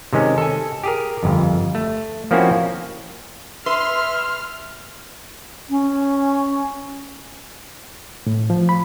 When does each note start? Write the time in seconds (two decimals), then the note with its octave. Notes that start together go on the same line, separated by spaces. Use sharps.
0.13 C3 D#3 G#3 C#4
0.38 A4 G#5
0.84 G4 G#4 A#4
1.23 G1 F2
1.75 A3
2.31 F3 A#3 C4 C#4 E4 F#4
3.66 B4 E5 C6 F6
5.70 C#4
8.27 A2
8.50 F3
8.69 B5